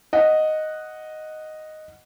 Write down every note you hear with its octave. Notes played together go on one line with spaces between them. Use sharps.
D#5 F#5